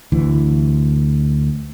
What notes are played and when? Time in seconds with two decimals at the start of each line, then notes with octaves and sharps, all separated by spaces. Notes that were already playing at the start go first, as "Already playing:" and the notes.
0.12 D2 E3